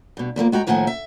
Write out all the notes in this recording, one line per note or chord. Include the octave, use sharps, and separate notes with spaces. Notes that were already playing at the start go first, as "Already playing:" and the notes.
G2 B2
E2 F3 A3 A#3
G#3 F#4 G5 A#5
D#2 A2 D#3 F3 F#5 G#5
E5